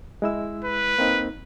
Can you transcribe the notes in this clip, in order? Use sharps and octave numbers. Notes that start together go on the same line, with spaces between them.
G#3 E4 E6
B4
A#3 C4 D#4